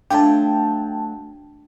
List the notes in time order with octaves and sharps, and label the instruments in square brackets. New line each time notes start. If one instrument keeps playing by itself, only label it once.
[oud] F#3 A3 F4 [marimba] D4 [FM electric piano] G5 A5